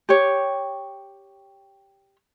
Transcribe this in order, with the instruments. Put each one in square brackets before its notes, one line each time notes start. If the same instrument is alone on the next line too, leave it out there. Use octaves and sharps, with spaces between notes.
[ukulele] G4 C#5